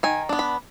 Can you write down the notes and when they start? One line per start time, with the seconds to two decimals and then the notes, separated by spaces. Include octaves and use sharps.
0.03 D#3 G#5
0.29 B3 D4
0.39 B5